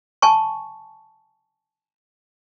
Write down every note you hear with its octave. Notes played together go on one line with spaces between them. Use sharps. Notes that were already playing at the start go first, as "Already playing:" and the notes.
G#5 A5 C#6